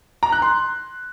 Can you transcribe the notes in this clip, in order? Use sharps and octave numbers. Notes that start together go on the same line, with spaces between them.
A#5
F#6
C6